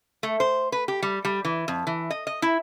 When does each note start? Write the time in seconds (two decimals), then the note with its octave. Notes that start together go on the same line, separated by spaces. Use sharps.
0.23 A3
0.40 C5
0.72 B4
0.88 G4
1.02 G3
1.25 G3
1.45 E3
1.68 F2
1.87 E3
2.10 D#5
2.27 D#5
2.42 E4